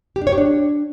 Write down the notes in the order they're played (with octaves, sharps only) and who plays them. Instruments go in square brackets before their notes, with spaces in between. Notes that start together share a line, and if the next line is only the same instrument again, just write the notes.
[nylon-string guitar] G4
D4
C#5
G4
D4